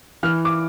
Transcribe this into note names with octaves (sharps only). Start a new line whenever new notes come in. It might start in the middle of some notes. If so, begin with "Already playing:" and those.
E3 F6
D6